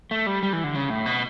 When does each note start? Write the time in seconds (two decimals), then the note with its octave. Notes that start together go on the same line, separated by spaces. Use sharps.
0.11 A3
0.27 G3
0.43 G3
0.53 E3
0.64 D3
0.75 C#3
0.90 A2
1.06 B2